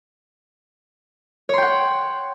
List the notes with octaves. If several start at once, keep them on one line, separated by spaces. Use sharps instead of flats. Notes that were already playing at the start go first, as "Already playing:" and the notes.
C#5 F#5 G5 C6